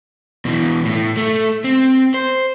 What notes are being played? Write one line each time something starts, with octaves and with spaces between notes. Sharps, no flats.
B2 E3
A2
A3
C4
C5